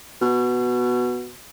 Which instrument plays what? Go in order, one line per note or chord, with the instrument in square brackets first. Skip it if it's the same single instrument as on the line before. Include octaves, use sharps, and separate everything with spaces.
[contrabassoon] B2